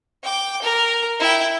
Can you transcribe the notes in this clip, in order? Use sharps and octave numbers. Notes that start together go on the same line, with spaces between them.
G5 D6
A#4
E4 G5